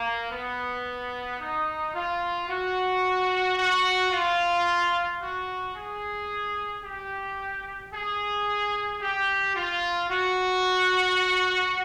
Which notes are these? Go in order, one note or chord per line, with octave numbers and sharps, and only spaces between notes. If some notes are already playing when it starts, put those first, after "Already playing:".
Already playing: A#3
B3
D#4
F4
F#4
F#4
F4
F#4
G#4
G4
G#4
G4
F4
F#4